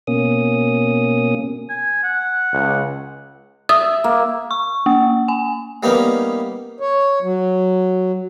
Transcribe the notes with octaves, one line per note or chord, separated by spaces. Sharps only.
B2 A#3 C#4 D#6
G#5
F#5
C#2
E5 D#6
A#3
C#6
A#3
G#5
G3 A#3 B3 C#4 D#4
C#5
F#3